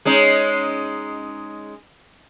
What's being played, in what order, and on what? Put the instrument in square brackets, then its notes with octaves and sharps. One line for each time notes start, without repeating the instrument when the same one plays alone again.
[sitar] G#3 C#4 D#4